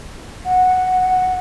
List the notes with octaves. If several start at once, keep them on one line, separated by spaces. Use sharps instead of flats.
F#5